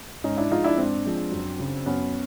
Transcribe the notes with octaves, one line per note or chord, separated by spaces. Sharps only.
G#2 C#4 D#4
D4 E4
F3 G#3 D#4 F4
D4 E4
G#2 C4 D4
F3 G#3
F#2
C#3 F#3
F#2 B3 C#4